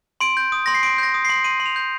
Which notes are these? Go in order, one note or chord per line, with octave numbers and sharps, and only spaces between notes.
C6 D7
G6
D#6
C6 A#6
C7
C6 D7
G6 A#6
D#6
C6 C7
C6 D#7
C6
F7
G6